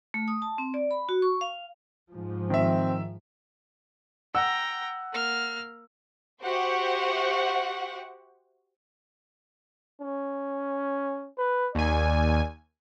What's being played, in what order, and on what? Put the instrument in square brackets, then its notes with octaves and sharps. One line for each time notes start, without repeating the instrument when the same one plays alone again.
[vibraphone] A3
D#6
A5
C4
D5
B5
F#4
C#6
F5
[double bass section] G#2 F3
[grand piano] D#3 E5 [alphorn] C4
[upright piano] F#5 E6 [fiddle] G5 A#5
[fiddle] A#3 F6
[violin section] F#4 G4 C5 E5 F#5 C#6
[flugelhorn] C#4
B4
[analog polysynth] D#2 G#5 [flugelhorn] D5